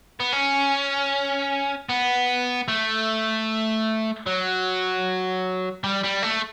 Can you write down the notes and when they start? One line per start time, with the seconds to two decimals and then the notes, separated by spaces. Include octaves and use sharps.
0.20 B3
0.32 C#4
1.89 B3
2.68 A3
4.27 F#3
5.84 G3
6.04 G3
6.23 A3